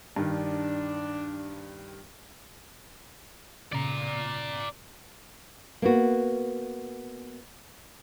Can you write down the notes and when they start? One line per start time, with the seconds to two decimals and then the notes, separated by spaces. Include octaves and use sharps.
0.16 G2 D#3 D4
3.72 A#2 C#3 C#4 D5 A#5
5.82 A#3 B3 F#4